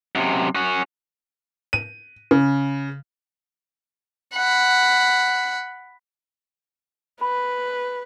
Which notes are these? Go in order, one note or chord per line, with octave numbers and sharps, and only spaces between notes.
F#2 C3
C#4 F#4
D#7
C#3
F#5 B5
B4 B5